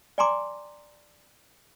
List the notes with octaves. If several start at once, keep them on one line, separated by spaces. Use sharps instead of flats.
D5 G5 G#5 A#5 C6 D6